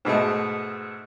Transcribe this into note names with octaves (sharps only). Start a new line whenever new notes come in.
G#2 B2 G#3 A3